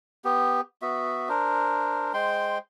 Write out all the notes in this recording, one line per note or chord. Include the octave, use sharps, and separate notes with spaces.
B3 G4
B3 F#4 E5
D4 A#4 C5
G#3 C5 G5 C6